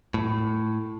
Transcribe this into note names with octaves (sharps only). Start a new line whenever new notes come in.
A2